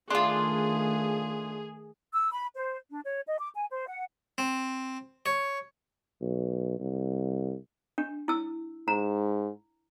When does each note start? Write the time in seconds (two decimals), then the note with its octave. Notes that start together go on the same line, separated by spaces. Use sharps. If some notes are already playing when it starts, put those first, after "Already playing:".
0.11 D#3 A3 D4 F4 G#4 C6
2.13 E6
2.30 B5
2.55 C5
2.91 D4
3.04 C#5
3.27 D#5
3.39 D6
3.55 G#5
3.70 C5
3.87 F#5
4.38 C4
5.26 C#5
6.21 B1
6.79 C2
7.98 D4
8.28 E4 E6
8.88 G#2 A#5